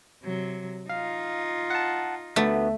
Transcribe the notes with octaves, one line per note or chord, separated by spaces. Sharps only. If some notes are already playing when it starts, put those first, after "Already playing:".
C3 F#3
D#4 F4 F5
F#5 A5
D2 D3 A3 B3